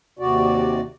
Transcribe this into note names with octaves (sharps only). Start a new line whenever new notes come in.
D#2 C3 F#4 D5